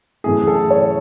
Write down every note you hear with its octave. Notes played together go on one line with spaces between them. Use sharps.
F#2 E3 A3 G#4
G#4
A4
C#5